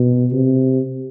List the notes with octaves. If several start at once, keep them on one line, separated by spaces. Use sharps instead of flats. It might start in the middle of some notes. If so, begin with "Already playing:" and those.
Already playing: B2
C3